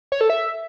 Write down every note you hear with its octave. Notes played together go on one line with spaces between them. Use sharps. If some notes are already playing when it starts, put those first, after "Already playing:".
C#5
A4
E5